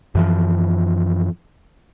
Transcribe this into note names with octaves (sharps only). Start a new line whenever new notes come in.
F#2 E3 F3